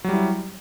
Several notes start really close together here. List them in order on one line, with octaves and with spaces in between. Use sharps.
F#3 G3 E4